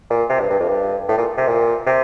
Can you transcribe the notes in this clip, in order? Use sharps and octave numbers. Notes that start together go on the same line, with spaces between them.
A#2
C3
G2
G2
F2
G2
A2
A#2
C3
A#2
C3